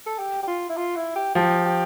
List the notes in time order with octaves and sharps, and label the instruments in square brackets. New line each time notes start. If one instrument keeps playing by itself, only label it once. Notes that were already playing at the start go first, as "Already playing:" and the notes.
[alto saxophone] A4
G4
G4
F4
E4
F4
E4
G4
[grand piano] F3 [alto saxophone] G4
[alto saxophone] G4